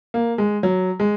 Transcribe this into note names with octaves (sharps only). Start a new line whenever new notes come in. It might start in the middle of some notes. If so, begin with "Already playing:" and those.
A#3
G#3
F#3
G#3